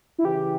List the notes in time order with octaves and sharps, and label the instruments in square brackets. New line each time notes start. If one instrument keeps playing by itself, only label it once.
[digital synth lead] E4
[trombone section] C#3 E3 [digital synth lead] G4